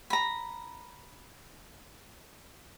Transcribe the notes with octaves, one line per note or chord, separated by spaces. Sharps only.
A#5 B5